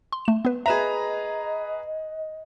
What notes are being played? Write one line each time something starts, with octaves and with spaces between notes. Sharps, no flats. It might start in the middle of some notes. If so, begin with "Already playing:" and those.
C6
A3 E7
B3 B4
G#4 B4 D#5 E5 A#5 E7